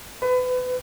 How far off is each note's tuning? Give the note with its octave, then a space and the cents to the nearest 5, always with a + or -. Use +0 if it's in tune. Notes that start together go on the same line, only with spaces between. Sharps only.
B4 +30